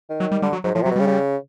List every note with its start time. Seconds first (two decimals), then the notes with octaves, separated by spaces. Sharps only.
0.10 D#3
0.20 F#3
0.31 G3
0.42 D3 G3
0.53 F#3
0.64 G#2 F#3
0.74 A2 F3
0.82 C3
0.86 F#3
0.91 B2
0.96 C#3 G3
1.07 C#3